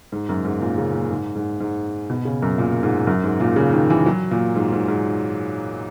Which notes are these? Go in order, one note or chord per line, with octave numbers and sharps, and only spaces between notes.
G#2
F#2
G#2
A#2
C#3
A#2
G#2
G#2
G#2
B2
C#3
F#2
A#2
G#2
F#2
G#2
A#2
C#3
D#3
E3
F#3
A#2
G#2
G#2
G#2